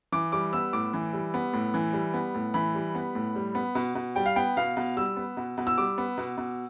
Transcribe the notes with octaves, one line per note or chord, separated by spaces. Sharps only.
E3 D6
G3 D6
B3 E6
A2 D6
E3
G3
B3
A2
E3
G3
B3
A2
E3 B5
G3
B3
A2
G3
B3
B2
B2
G3 G5
F5
B3 G5
B2 F5
B2
G3 E6
B3
B2
B2
E6
G3 D6
B3
B2
B2